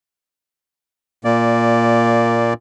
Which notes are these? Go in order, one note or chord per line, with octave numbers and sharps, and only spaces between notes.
A#2 A#3 D5